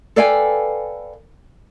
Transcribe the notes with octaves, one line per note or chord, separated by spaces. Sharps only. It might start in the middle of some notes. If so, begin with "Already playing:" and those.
A4 B4 D5 F5 G5 G#5